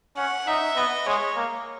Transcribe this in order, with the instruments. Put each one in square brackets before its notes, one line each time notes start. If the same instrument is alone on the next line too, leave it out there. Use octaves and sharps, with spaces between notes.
[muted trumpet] C#4 [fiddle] F#5
[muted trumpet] D#4 [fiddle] E5
[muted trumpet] B3 [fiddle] D#5
[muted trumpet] G#3 [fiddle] C#5
[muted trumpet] A#3